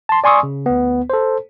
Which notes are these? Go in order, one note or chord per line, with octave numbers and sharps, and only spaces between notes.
A5 C6
D5 G#5 C6 C#6 D#6 E6
C#3
D2 B3
A4 C5